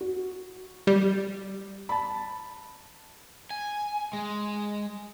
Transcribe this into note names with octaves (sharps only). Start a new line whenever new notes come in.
F#4
G3
A5 B5
G#5
G#3